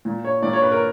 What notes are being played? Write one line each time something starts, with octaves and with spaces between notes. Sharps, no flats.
A#2
C#5
A#2 D5
C#5
B4
A#4